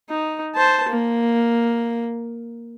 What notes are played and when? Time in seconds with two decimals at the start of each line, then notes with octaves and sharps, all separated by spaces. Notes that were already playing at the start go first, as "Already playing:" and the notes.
0.10 D#4
0.55 C5 A5
0.88 A#3